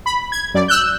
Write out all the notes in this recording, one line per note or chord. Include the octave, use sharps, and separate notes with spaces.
B5
G#6
F#2 D5
E6 F#6 G6